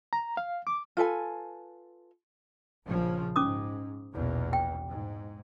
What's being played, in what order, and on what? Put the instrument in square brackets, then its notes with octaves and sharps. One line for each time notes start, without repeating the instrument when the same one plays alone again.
[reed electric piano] A#5
F5
D6
[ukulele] F4 A4 B4 G#5
[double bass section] A#1 C#3 F3
[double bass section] G#2 [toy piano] C#4 D6 D#6
[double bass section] A#1 E2 B2
[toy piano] G5
[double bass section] G#2